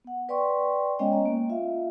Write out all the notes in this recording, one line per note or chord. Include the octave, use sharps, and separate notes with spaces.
B3 F#5
B4 D5 G5 C6 C#6
G#3 B3 C#4 C#5 D#5 G5
D#5 A#5
A#3
F4 E5 F5